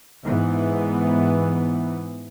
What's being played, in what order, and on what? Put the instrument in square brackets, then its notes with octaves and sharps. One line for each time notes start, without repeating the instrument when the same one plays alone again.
[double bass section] G#2 E3 B3